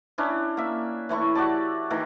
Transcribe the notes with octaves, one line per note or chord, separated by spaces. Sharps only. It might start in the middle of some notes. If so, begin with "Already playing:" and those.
C#4 D4 E4
A#3 E5
E3 A3 E4 C#6
F#4 G4 D5 A5
D#3 E3 A3